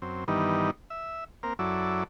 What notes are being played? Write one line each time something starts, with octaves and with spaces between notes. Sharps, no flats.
F#2 C4
G2 D#3 E3 G3 B3 D#4
E5
A#3 C4 A#4
F#2 F#3 E4 A4 D5